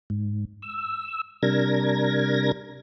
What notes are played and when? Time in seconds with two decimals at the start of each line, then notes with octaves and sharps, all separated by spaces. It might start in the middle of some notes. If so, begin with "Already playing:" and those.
0.10 G#2
0.62 E6
1.43 C3 G3 D4 A#4 G#6 A#6